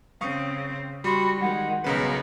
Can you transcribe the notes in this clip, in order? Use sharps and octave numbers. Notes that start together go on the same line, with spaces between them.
C#3 C4 F5 C#6 D#6
G3 F#4 B5 C6
D#3 G#3 F#5
B1 C#3 B3 A#4 B4